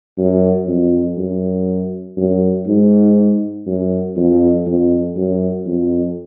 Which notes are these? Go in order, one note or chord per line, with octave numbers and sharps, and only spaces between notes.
F#2
F2
F#2
F#2
G#2
F#2
F2
F2
F#2
F2